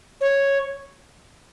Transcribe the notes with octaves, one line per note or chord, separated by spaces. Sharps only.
C#5